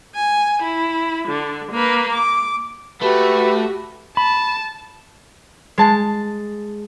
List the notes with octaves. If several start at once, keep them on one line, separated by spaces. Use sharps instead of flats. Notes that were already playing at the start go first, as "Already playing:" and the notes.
G#5
E4
D3
A#3 B4
D6
A3 F#4 G4 B4
A5 B5
G#3 A5